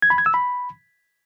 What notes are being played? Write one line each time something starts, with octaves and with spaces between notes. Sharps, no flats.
G#6
B5
G#6
E6
B5